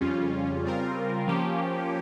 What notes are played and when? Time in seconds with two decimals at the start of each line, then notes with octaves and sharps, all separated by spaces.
0.01 F2 C#3 G3 C#4 F4
0.65 C#3 G3 C4 F4 A#4
1.27 F3 A#3 C#4 G4